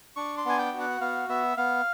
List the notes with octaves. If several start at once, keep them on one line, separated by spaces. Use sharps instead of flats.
D4 C#6
C6
B3 G#5
G5
F#4
F#5
B3 F5
B3 E5
B3 F5